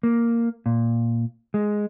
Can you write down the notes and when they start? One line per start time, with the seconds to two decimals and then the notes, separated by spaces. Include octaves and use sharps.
0.03 A#3
0.66 A#2
1.54 G#3